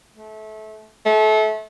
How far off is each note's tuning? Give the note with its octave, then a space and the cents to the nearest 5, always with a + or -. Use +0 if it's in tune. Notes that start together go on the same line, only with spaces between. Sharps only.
A3 -25
A3 -30